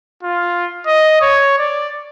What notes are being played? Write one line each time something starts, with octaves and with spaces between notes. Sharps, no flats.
F4
D#5
C#5
D5